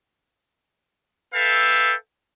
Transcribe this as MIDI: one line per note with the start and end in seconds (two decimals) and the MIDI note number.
1.34 1.94 69
1.34 1.94 71
1.34 1.94 76
1.34 1.94 77
1.34 1.94 79